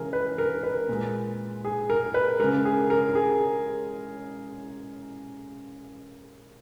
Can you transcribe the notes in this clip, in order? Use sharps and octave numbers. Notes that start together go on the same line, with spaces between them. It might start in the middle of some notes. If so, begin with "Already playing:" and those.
Already playing: C#3 E3 G#3 G#4 A#4
B4
A#4
B4
A#2 G#3
G#4
A#4
B4
C#3 G#3 A#4
G#4
A#4
A#4
G#4